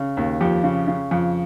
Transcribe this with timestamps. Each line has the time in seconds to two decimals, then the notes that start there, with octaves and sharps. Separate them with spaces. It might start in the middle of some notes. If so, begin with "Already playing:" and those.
Already playing: C#3
0.17 D#2
0.41 F2 G4
0.64 C#3
0.88 C#3
1.11 F2